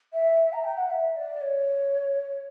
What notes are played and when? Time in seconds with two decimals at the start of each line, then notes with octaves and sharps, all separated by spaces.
0.13 E5
0.53 A#5
0.64 G5
0.77 F#5
0.90 E5
1.16 D5
1.41 C#5